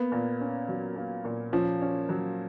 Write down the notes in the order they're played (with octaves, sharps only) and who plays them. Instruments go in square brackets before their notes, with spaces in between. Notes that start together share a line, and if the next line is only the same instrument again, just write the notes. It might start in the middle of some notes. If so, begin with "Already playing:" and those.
Already playing: [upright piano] A#3 [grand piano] B3
[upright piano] A#2
C#4
F#3
A#3
A#2
[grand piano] F3 [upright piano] C#4
[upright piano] C#4
F#3